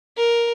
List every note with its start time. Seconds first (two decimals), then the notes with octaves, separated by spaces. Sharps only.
0.17 A#4